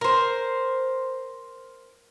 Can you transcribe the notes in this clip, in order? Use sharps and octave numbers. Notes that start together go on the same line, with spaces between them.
A#4 C5